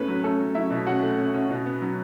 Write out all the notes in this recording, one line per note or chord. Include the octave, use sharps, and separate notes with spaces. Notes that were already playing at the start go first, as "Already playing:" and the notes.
Already playing: A2 A3 B3 C#4 B4
F#3
A3 C#4 A4
F#3
F#3 E4 E5
B2
C#4 F#4 F#5
A3
C#4
C#4
B2
B3
F#3